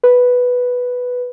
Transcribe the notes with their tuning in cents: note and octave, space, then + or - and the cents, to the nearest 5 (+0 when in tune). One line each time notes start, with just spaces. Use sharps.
B4 +0